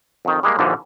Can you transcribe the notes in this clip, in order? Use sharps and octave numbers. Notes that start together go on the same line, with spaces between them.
F2 D#3
G3 G#3 A#3
A#1 D#2 A#2 D3 E3 F3